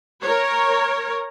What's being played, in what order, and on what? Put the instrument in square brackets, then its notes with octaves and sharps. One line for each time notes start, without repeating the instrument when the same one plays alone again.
[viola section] A#4 C#5